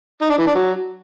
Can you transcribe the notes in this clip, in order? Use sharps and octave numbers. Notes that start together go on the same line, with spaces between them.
D#4
D4
E3
D4
F#3